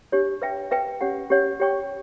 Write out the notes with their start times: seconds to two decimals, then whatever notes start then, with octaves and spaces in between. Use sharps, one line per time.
0.12 D4 G4 C#5
0.42 B4 E5 G5
0.71 B4 E5 G5
1.01 C#4 G4 C#5 F#5
1.30 C#4 G4 C#5 F#5
1.60 G4 C#5 G5 C#6